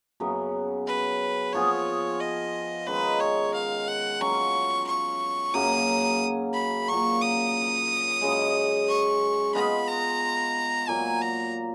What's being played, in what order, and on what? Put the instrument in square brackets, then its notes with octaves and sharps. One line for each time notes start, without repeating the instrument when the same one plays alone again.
[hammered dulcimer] F#2 C#3 F#3 B3
[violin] B4
[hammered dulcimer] F3 B3 F4 G#4 [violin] C#5
[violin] D#5
[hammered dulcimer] D#3 G#3 C#4 F4 [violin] B4
[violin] C#5
F5
F#5
[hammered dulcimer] F#3 C#4 F4 [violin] C#6
[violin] C#6
[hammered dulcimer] F#2 C#3 F#3 A#3 [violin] D#6
[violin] B5
[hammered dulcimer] A#2 F#3 A#3 [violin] C#6
[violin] D#6
[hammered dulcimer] F#2 C#3 G#3
[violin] C#6
[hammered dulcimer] G#3 B3 F4 B4 [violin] B5
[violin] A#5
[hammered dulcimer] A#2 F#3 A#3 [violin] G#5
[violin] A#5